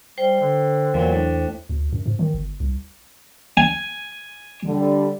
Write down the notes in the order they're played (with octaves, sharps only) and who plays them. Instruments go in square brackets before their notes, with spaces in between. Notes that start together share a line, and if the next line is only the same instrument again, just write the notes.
[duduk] G3 [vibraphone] C5 G5
[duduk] D3
[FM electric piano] E2 [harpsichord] A#2 F#3
[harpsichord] A2 [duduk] D4
[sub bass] D2
F#2
G#2
D#3
G1
C2
[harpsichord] G#5
[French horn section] D3 G3